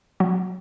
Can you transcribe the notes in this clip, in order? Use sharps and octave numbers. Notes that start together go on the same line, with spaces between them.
F#3 F#4